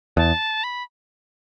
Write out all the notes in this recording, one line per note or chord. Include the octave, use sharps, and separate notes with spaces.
E2 A5
B5